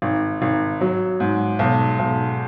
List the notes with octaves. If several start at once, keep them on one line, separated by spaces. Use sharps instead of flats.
G#1
G#1
F#3
G#2
B1
B1